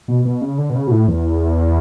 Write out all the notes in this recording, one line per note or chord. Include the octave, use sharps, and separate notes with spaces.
B2
B2
C#3
D3
B2
C#3
B2
A2
E2